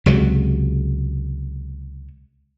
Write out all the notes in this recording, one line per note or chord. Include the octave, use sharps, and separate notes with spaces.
C#2 C3 F#3 G#3